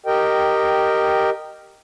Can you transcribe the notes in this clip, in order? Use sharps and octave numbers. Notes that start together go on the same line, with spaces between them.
G4 A#4 D#5 G5